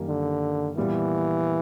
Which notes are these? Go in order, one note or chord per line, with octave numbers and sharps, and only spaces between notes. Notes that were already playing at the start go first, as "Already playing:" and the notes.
Already playing: F#2 D#3 G3 A#3
D3
A#2 E3 G3 B3